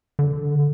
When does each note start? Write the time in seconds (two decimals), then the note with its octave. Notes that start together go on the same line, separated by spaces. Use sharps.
0.19 D3